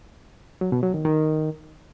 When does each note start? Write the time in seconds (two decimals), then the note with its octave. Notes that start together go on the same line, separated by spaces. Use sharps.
0.61 F#3
0.72 B2
0.83 F#3
0.94 D#3
1.05 D#3